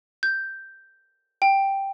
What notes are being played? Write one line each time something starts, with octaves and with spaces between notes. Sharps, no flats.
G6
G5